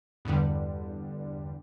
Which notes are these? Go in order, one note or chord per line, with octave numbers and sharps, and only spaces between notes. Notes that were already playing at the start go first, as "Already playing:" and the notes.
E2 G2 D3 G3